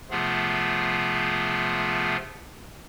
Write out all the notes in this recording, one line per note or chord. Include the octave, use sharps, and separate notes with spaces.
C3 F3 A3 B3 F4 G#4